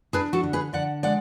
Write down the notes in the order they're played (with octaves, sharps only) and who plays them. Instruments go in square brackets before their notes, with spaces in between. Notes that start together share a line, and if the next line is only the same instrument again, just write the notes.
[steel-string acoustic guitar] D4 G#4 B4
F#4 A4
D3
G#4 B4
D3 D5 F#5
G#3 D5 F#5